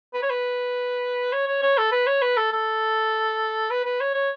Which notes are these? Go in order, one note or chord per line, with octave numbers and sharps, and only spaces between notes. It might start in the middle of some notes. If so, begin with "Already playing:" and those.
B4
C#5
B4
C#5
C#5
C#5
A4
B4
C#5
B4
A4
A4
B4
B4
C#5
C#5